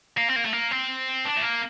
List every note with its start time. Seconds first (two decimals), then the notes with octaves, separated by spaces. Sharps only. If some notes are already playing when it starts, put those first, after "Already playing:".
0.18 A#3
0.29 C4
0.36 A#3
0.45 A3
0.53 A#3
0.72 C4
1.25 D4
1.37 A3
1.42 A#3